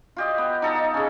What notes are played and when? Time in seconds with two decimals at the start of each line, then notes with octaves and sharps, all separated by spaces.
0.16 F4 G4 D#5
0.38 B3
0.62 D#4 A4 A#5
0.94 C#3 C#4